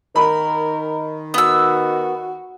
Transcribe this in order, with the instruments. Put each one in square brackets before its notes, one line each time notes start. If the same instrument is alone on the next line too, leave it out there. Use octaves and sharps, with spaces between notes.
[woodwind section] D#3 [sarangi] A#4 [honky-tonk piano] B5
[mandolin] B3 E6 [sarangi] F#4